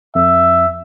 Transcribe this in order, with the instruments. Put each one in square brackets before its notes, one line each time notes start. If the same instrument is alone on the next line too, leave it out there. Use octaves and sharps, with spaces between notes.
[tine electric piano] F2 [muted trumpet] E5